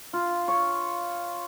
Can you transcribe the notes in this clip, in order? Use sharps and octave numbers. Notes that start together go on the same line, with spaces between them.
F4
C#5